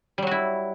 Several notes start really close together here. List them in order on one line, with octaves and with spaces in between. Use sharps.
G3 F#3 F#4 E4